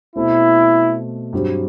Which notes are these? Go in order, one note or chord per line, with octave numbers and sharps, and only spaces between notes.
B2 A3 C4 E4
G2 F#3 C4 G4